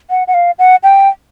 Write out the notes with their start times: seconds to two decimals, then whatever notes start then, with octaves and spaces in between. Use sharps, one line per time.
0.10 F#5
0.28 F#5
0.34 F5
0.59 F#5
0.83 G5